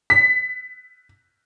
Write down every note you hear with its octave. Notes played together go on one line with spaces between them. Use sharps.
B6